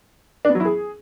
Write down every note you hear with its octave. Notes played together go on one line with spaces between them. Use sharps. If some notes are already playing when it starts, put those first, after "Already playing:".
D4
B3
F#3
E4
G#4